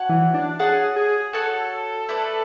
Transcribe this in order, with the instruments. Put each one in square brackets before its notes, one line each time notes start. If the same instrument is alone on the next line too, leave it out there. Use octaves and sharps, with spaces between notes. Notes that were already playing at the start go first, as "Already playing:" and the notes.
Already playing: [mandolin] F#4 C#5 F#5 A5
[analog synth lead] E3
D4
[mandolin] F#4 C#5 F#5 A5 [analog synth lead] G#4
[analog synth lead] G#4
[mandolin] F#4 C#5 F#5 A5 [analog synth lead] A4
[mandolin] A3 E4 B4 D5